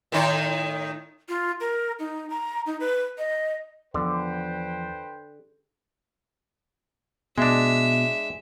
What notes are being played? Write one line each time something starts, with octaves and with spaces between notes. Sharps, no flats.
A2 D#3 D#4
F4
A#4
D#4
A#5
D#4
B4
D#5
E2 D3 F3 B4 C5 G5
B2 G#3 D4 E5